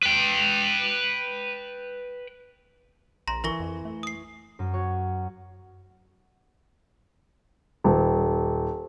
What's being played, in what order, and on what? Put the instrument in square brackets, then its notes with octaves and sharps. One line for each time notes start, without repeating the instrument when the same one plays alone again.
[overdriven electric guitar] B4 G5
[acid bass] A#1 [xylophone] A#5 C6 A#6
[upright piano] E3 C#6 [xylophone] A#4 A#6 G7
[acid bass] F2
A3
[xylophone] D#6 C7
[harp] F#2
F#4 C#5
[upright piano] D#1